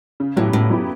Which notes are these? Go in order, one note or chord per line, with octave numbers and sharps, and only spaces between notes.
C#3
A2 F#3 B3 E4 G4
A2 C#3
F#3 B3 E4 G4